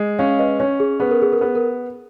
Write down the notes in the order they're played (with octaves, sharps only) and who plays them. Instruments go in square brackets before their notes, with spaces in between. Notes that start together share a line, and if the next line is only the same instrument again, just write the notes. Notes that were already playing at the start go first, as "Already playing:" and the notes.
Already playing: [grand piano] G#3
[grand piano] C#4 [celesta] C#5 F5
[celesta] F5
B4 D#5
[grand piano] C#4 [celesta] C#5
[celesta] G#4
[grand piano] B3 [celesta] G#4
[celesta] A#4
G#4
A#4
[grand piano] B3 [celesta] G#4
[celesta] A#4